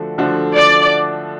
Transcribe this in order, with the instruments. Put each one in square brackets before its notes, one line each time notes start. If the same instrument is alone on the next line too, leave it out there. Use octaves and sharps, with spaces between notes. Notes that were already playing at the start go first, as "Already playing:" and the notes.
Already playing: [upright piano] D3 F3 A3 D4 F#4
D3 F3 A3 D4 F#4
[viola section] D5